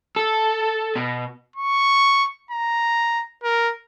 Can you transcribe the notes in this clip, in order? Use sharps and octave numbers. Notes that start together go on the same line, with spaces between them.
A4
B2
C#6
A#5
A#4